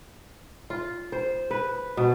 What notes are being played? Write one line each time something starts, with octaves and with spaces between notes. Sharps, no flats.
F4
C5
B4
B2